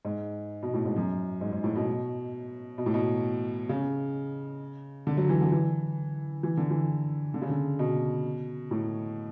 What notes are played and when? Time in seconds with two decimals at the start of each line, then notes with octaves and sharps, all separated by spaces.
0.05 G#2
0.63 B2
0.74 A2
0.85 G#2
0.96 F#2
1.41 G#2
1.52 G#2
1.64 A2
1.76 B2
2.78 B2
2.86 A2
2.94 B2
3.69 C#3
5.07 D3
5.17 F#3
5.29 E3
5.41 D3
5.52 E3
6.43 E3
6.57 D3
6.71 E3
7.34 D3
7.42 C#3
7.50 D3
7.79 B2
8.71 A2